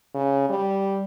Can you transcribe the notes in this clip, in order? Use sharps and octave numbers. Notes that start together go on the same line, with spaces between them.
C#3
G3